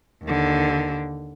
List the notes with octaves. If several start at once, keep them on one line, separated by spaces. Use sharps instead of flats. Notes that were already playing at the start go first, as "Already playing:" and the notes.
D#2 D3